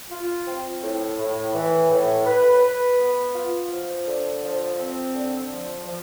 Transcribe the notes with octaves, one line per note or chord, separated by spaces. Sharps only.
F4
C4
A2
A2
E3
A2
B4
B4
B3
F4
F3
D3
F3
C4
D3
F3
F3